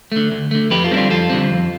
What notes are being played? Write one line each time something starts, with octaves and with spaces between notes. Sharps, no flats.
D3 A3
D2
D3 A3
F2 G4 B4
F4 A4
D3 G3 C4 E4
D4 F4
F2 F4 A4
D3 G3 C4
F2